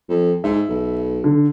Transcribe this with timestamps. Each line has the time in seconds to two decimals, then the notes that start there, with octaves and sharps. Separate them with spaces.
0.09 F2
0.44 G#2 E5
0.69 B1
1.24 D3